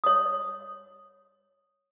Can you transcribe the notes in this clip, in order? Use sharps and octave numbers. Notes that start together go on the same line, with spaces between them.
C#5 D#6